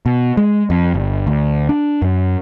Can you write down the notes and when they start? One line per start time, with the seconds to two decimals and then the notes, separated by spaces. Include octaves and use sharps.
0.06 B2
0.37 G#3
0.70 F2
0.94 G1
1.27 D2
1.69 D4
2.02 F#2